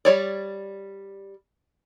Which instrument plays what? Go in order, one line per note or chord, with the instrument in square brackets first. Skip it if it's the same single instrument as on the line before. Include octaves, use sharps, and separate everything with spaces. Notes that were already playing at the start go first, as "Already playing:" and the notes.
[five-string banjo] G3 C#5 D5